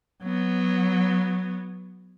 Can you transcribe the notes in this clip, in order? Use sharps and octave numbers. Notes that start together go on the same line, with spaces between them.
F#3 B3